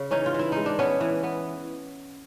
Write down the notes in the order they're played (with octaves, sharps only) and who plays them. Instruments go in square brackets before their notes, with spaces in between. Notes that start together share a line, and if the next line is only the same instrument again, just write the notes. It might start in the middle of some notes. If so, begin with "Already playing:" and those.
Already playing: [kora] C#3
E3 C#4 D#4
F4
E3 E4
G#3 D#4
D4
B3 C#4
E3
B3